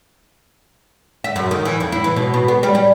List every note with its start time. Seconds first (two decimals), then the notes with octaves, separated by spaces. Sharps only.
1.24 E5
1.36 F#2
1.51 D#3
1.65 E3
1.80 F2
1.92 E4
2.04 E3
2.16 B2
2.34 B2
2.48 B3
2.63 G3
2.75 G3